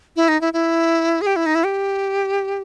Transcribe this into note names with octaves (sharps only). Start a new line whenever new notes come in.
E4
D#4
E4
E4
G#4
G4
E4
D#4
E4
G4